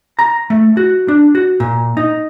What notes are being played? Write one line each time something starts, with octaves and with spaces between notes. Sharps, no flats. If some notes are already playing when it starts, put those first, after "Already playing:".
A#5
A3
F#4
D4
F#4
A#2
D#4